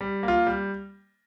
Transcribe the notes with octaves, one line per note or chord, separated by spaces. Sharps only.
G3
A#3
F4
G3